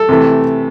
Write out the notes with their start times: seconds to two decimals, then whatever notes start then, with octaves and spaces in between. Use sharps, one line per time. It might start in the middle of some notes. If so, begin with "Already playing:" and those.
Already playing: A4
0.09 C3 E3 A3